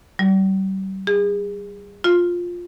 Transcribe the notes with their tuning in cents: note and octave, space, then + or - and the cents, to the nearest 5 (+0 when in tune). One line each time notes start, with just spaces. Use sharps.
G3 -35
G#4 -35
F4 +10